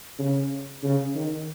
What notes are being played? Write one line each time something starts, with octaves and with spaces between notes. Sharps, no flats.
C#3
C#3
D#3